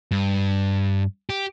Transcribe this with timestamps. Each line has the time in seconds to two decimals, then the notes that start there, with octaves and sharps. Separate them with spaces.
0.11 G2
1.30 G4